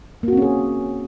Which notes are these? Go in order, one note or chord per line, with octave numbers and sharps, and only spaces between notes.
A#3 C4 C#4 F#4 G#4